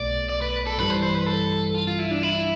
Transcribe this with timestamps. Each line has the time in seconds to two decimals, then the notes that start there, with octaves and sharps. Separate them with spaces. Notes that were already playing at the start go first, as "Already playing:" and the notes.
Already playing: B1 B2 A3 D5
0.29 D5
0.42 B4
0.67 A4
0.78 G2 E3 G3 B4
0.90 C5
1.02 C5
1.15 B4
1.26 A4
1.74 F4
1.87 F4
1.99 E4
2.11 D4
2.23 E4